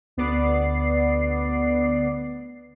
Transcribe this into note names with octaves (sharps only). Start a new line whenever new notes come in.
D2 B3 D5 C7